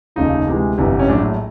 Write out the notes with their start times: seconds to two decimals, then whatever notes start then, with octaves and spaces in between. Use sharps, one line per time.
0.16 F1 D#2 C#3 F3 A3 D#4
0.47 D2 C3 E3 G#3
0.78 G1 F2 C3 E3
1.00 C#4
1.08 A#1 A2 F#3 A3 D4